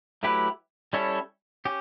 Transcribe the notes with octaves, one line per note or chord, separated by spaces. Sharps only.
F#3 A3 E4 G4 B4
G3 C#4 E4 A4 C#5
C#4 G4